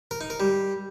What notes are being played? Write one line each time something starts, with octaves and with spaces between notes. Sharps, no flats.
A#4
D#4
A#4
G3